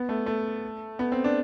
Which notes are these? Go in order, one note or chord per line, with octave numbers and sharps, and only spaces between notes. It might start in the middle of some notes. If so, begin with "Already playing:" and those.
Already playing: B3
A3
A3
B3
C4
D4